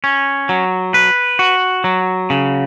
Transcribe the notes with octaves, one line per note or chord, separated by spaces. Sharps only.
C#4
F#3
B4
F#4
F#3
C#3